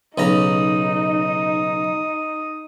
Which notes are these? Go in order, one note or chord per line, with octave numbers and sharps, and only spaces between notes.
B1 C#3 D#4 A#5 D#6